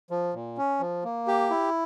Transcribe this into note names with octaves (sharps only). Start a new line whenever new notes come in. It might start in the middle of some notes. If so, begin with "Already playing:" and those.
F3
A#2
C#4
F3
A#3
G4
E4